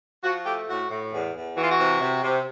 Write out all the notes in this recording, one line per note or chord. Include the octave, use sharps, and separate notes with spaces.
F3 F#4
A3 G4
A2 F#4
A2
E2
E2
E3 F#4
F4
F#4
C3
C3
C3